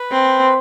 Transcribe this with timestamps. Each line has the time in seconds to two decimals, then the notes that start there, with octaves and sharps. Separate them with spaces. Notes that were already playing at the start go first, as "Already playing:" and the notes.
Already playing: B4
0.11 C4